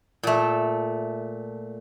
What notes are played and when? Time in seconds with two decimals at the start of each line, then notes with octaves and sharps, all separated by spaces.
0.23 A#2 A3